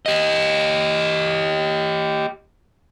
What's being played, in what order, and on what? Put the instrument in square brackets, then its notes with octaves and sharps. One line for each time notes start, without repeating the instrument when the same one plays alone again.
[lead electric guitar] G4 D#5